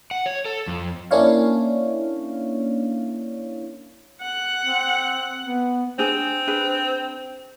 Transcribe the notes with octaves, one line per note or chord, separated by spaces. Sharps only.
F#5
C#5
A4
F2
A#3 C#4 D4 E4 C#5 F5
F#5
C4
B3
C4 D4 G#4
D4 G#4 B4